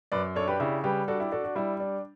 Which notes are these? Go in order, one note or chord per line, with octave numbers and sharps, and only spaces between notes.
F#2 B4 D5
D4 A4 C#5
G4 B4
C#3 E4 G4
G3 G4 B4
D4 F#4 A4
E4 G4
D4 F#4 A4
F#4
G3 E4
D4